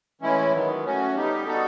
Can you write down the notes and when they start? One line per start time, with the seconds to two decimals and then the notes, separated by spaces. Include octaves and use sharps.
0.21 A2 E3 G#3 C#4 E4
0.53 D#3 F#3 B3
0.84 A3 C#4 F#4
1.16 G3 B3 D#4 G4
1.47 G3 B3 D#4 F#4 A4